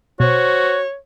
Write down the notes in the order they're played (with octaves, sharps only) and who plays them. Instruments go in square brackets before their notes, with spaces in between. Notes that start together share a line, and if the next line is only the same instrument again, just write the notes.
[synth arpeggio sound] B2 [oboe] F#4 [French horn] C5 [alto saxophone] C#5